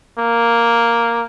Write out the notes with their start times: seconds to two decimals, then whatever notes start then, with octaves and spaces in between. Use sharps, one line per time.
0.19 A#3